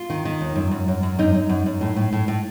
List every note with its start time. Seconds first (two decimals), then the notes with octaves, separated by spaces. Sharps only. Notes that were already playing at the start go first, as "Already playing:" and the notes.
Already playing: F4
0.10 D#3
0.25 D#3
0.41 D#2
0.56 F#2
0.71 F#2
0.88 F#2
1.03 F#2
1.19 F#2 D#4
1.35 F#2
1.49 F#2
1.66 F#2
1.81 A2
1.96 A2
2.13 A2
2.28 A2